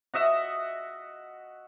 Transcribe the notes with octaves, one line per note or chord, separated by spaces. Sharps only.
F#4 D#5 E5 F#5